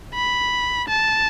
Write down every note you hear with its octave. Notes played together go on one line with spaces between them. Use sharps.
B5
A5